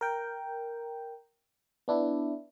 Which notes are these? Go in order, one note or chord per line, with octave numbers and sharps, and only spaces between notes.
A#4 G5
B3 D4 E4